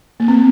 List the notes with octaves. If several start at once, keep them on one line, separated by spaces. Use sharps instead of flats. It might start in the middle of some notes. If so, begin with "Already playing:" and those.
A#3
C4